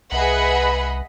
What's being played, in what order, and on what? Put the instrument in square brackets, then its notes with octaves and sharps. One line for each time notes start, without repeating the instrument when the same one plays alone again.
[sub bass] C2 [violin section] G#4 E5 F#5 [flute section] B4 [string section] D#5 B5